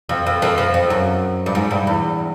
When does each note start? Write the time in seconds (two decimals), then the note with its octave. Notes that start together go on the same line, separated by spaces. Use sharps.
0.09 F2
0.26 F2
0.42 F2
0.58 F2
0.74 F2
0.90 F#2
1.46 G2
1.55 G#2
1.71 G2
1.87 E2